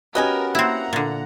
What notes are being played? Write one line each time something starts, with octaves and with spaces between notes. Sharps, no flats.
B3 C#4 F#4 G4 A#4 D#5 G#5
A#3 C4 E4 F#5 A#5
A#2 D3